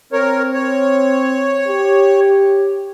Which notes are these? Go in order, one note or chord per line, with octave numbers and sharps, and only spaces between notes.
C4 A#4 C#5
C#5
G4